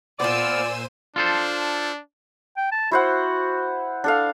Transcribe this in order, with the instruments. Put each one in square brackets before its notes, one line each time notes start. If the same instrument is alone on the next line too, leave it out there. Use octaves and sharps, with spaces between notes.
[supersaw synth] A#2 C5 D#7 [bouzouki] B3 F4 [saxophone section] D5 [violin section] G#5 E6
[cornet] D4 [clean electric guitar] F4 A4 C5
[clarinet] G5
A5
[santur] E4 C5 F#5 [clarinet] F#4
[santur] D4 A4 F5